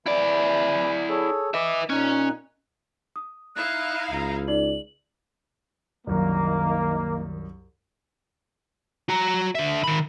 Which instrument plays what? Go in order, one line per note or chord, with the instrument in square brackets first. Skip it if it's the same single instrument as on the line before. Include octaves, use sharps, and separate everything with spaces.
[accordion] E3 B5 [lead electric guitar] E4 D5
[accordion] G#4 A4 C#5
[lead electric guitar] B4 E5 [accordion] D#5 D6
[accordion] A#2 D#4 F#6 [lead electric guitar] C#4
[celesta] D#6
[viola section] D#4 E4 F5 [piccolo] F#6
[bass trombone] C#2 [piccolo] A#5
[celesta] D#4 G#4 D5 [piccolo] F#7
[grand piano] C2 F#2 [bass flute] D#3 [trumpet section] A#3
[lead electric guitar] F#4 A#5
D3 E5
D#3 B5